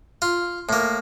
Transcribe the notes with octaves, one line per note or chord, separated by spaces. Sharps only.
F4
A2 A#3